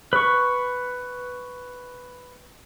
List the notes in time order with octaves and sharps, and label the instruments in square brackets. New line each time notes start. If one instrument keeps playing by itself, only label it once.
[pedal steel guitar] B4 C#6